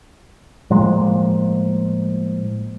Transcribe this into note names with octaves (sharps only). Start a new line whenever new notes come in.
A2 F3 G#3 A#3